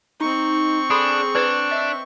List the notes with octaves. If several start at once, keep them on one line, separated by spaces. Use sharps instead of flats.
C4 D#4 C#6
D4 G#4 A4 B5 C6
D4 E4 B4 D5
D#5 E5